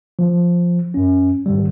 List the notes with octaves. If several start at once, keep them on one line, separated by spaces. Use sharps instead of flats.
F3
F#2 C#4
G#2 D#3 G3